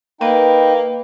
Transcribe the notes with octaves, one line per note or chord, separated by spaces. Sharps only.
A#3 D#4 B4 G5